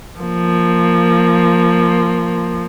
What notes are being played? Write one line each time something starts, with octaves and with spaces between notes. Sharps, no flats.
F3 A#3